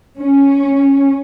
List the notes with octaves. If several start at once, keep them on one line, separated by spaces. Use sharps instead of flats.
C#4